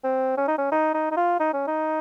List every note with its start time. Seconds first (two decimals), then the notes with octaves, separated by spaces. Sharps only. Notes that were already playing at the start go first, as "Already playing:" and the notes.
0.04 C4
0.37 C#4
0.48 D#4
0.58 C#4
0.72 D#4
0.94 D#4
1.11 D#4
1.17 F4
1.40 D#4
1.53 C#4
1.67 D#4